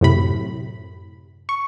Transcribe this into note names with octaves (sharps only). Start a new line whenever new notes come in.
F#2 A2 C3 B5
C#6